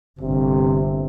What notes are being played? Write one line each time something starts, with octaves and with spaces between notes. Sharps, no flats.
G1 C3